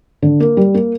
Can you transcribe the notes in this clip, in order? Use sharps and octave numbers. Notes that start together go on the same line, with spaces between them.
D3
A#3
G3
A#3